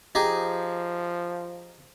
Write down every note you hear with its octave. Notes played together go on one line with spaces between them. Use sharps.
F3 D#4 G4 G#4